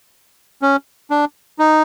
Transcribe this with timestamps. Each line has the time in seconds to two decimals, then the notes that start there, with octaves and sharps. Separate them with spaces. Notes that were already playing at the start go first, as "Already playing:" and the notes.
0.62 C#4
1.10 D4
1.59 D#4